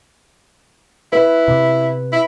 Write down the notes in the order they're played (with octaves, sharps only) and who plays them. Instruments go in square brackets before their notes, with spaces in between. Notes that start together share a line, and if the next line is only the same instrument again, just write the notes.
[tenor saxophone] E4 [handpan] B4
[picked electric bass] C3
[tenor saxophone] E4